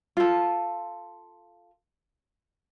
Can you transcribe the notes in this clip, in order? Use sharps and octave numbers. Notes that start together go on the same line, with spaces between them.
F4 A4